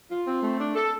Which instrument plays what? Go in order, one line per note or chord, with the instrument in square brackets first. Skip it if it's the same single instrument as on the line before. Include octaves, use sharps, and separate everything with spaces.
[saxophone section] F4
C4
A3
D4
A4